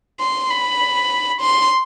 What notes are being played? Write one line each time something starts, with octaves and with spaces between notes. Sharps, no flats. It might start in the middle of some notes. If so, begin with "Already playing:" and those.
C6
B5
C6